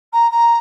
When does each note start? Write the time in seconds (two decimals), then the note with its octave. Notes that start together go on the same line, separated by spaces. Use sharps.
0.12 A#5
0.31 A#5